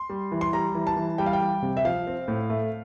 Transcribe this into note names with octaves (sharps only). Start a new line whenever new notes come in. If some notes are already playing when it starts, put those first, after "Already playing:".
Already playing: C6
G3
E3
C6
G3 A#5
E3
A5
E3
G3 G5
F5
G5
G3
C3
E5
F3 F5
C4
A2
A3